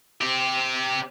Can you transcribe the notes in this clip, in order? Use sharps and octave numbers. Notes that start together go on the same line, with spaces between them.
C4 G4